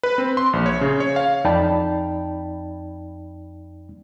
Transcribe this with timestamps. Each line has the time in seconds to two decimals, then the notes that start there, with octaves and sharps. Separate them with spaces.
0.03 B4
0.18 C4
0.37 C6
0.53 A#1
0.66 C#5
0.81 C#3
1.00 C#5
1.16 F5
1.45 F2 D#4 D5 G5 A5 B5